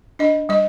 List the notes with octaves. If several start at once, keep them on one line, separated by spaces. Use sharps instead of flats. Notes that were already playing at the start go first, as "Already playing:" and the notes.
D4 D#5
G3 D#5